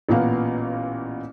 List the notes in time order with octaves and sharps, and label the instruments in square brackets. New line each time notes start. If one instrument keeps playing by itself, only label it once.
[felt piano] A1 A#2 A#3 B3 F5